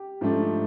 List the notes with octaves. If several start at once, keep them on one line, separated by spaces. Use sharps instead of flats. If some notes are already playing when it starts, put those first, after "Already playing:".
Already playing: G4
G#2 F3 A3 D4